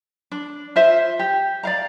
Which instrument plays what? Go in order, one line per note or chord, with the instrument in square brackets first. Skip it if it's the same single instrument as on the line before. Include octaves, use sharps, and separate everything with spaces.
[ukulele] D4
F4 C5 E5
G4
D5 F5 A#5